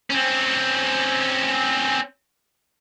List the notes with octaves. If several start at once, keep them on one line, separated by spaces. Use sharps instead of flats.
C4 C#4